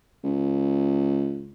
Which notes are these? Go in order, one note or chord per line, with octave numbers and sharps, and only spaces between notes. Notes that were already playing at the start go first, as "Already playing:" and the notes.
C#2